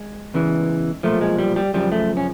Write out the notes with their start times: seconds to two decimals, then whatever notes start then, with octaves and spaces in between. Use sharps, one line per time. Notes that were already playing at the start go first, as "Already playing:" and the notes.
Already playing: G#3
0.34 E2 C#3 E3
1.03 B1 A#2 F3 A3
1.21 G#3
1.39 G3
1.56 G3
1.74 F#2 C#3 F3 G3
1.92 A3
2.17 C#4